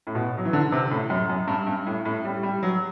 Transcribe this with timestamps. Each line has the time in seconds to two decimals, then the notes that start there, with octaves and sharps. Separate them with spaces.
0.07 A2
0.15 B2
0.38 F#3
0.45 E3
0.53 D3
0.72 C3
0.91 A2
1.10 F#2
1.30 F#2
1.48 G2
1.67 G2
1.86 A2
2.05 A2
2.24 G3
2.43 G3
2.63 F#3